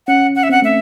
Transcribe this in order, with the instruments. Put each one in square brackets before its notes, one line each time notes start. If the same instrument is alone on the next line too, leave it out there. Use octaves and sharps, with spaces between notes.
[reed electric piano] C#4 [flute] F#5
[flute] F#5
E5
[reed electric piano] C4 [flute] F#5
[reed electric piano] A3 [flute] E5